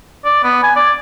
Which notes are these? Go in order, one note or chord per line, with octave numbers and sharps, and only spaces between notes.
D5
B3
G#5
D5